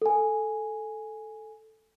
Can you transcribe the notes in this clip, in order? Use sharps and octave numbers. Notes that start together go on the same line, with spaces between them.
A4 G#5